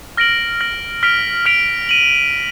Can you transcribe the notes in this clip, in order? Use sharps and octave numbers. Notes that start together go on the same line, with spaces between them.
F6 A#6 D7 F#7
F6 A#6 D7 F#7
F6 B6 D7 F7
F6 B6 D7 F7
D#7 F#7